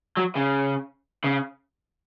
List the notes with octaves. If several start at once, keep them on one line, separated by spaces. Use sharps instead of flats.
F#3
C#3
C#3